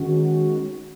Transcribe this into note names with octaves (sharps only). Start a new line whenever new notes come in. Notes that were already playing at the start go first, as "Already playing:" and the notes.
Already playing: D#3 G#3 C#4 F#4